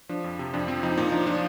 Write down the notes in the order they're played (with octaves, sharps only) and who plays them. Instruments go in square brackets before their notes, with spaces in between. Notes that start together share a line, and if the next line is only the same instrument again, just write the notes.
[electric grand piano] F3 D4
F2
C3
F2 D4
F3 C4
F2 D#4
A#2 D#4
F3 D4
F3 D4